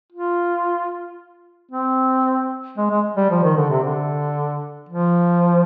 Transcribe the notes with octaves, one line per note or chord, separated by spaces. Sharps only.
F4
C4
G#3
G#3
G3
F3
D#3
D3
C3
D3
F3